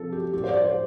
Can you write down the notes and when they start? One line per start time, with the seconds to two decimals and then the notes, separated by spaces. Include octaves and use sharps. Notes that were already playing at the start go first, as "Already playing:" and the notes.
Already playing: C3 F3 A4
0.12 G4
0.33 A2 G3 G4
0.44 C5
0.49 D5
0.64 C5